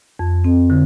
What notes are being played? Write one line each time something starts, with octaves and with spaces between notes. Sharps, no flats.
F2
C4
D3